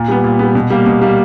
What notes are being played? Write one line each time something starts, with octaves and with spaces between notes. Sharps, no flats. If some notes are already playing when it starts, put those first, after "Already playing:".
Already playing: A#2
G3 B3
A#2
G3 B3
B2
G3 A#3
B2
G3 A#3